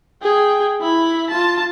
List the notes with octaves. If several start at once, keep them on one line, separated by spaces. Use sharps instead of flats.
G#4 G5
E4 B5
F4 A5